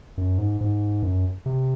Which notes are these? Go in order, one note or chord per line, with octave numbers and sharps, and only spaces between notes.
F#2
G#2
G#2
F#2
C3